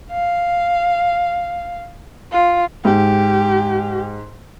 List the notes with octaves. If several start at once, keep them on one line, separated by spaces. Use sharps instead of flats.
F5
F4
G#2 G4